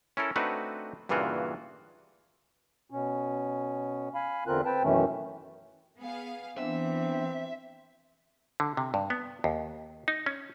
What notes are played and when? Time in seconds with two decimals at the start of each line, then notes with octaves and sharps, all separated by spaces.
0.17 C#4 E4 A4 A#4
0.36 A3 C4 D4 D#4 F#4 B4
1.09 G2 A#2 C#3 E3 F4 F#4
2.90 B2 C#4
4.15 F5 G#5 B5
4.47 E2 D3 C4 F4 A#4 F#6
4.65 C4 B4 G5 A5
4.83 F#2 B2 D#3 E3 A3 C#4
6.01 B3 G#4 F5
6.58 E3 B3 C4 D4 E5
8.60 D3
8.77 C3
8.94 G2
9.10 B3
9.44 D#2
10.08 D#4
10.26 C#4